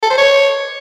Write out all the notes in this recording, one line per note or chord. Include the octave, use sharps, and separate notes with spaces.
A4
C5
C#5